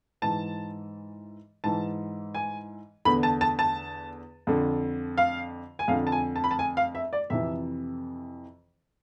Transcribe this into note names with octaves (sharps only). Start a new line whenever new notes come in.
G#2 E3 A5
G#2 E3 A5
G#5
E2 D3 B5
A5
A5
A5
F2 D3
F5
G#5
F2 D3 F5
A5
G#5
A5
B5
A5
G#5
F5
E5
D5
F2 C3 E3 E5